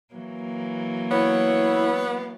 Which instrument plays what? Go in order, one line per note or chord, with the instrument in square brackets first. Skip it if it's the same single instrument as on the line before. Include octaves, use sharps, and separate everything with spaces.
[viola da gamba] E3 F#3 A#3
[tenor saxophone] B3 [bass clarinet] E4 [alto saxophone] C#5